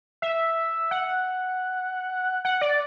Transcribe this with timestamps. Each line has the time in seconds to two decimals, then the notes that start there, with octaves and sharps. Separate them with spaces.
0.22 E5
0.91 F#5
2.45 F#5
2.61 D5